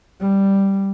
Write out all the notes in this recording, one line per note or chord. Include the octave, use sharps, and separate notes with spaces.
G3